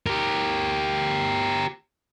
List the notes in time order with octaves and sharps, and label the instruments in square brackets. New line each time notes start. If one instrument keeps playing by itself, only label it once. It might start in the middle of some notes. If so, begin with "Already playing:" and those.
[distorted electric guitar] G4 A#4